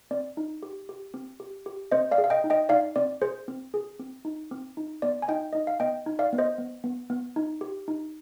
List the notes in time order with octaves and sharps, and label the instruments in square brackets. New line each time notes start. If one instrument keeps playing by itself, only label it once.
[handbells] C4 D5
D#4
G4
G4
C4
G4
G4
C4 C5 D#5
D5 F5
G#4
F5
D#5 G5
D#4
D#5 G5
D#4 D5 F5
C4 D5
G#4 C5
C4
G#4
C4
D#4
C4
D#4
B3 D5
G#5
D#4 D#5 G5
D#4 D#5
F5
B3 D#5 G5
D#4
D5 F5
B3
C5 D#5
B3
B3
B3
D#4
G4
D#4